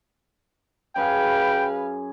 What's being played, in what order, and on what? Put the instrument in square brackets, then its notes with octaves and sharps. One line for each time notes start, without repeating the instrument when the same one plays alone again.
[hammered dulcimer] F#2 G#4 G#5 [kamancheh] B4 F5 [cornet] G5